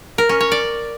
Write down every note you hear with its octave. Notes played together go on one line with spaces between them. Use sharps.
A#4
C#4
C#5
D5